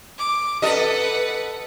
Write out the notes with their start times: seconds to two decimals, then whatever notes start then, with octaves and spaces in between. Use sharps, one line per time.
0.18 D6
0.62 A4 B4 D#5 F#5